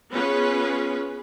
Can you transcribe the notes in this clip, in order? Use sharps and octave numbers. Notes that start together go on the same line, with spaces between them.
B3 C#4 F4 G#4 B4